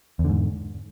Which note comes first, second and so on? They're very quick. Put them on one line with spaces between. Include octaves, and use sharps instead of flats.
E2 D3 G#2